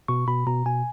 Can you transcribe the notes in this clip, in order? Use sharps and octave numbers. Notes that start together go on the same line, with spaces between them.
B2 C#6
B2 B5
B2 A#5
B2 G#5